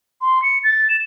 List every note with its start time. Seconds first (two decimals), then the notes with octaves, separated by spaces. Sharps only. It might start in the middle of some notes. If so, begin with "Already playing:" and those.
0.21 C6
0.42 C#7
0.64 A6
0.89 E7